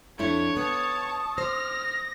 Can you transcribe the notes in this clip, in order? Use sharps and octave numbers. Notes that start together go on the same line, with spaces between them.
F2 A3 D4 E4 C#5
B3 A5 C#6 D#6
C5 F6 A#6